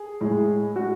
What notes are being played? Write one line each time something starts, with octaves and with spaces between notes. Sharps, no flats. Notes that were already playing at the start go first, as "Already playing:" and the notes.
Already playing: G#4
A2 G#3
F#4